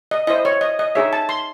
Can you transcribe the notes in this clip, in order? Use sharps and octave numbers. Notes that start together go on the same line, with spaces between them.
D#5
E4 C5 D#5
C#5
D#5
D#5
D#4 G#4 C#5 E5
A5
C6